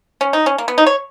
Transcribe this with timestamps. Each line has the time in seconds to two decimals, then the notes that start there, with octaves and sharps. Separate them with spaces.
0.21 C#4
0.33 D#4
0.46 C#4
0.58 A#3
0.68 B3
0.78 D#4
0.87 C#5